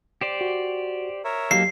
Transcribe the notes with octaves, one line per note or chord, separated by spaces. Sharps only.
G4 C5 D5
F#4
A#4 C#5 E5
F#3 A#3 D#4 G4 A4 F5 C7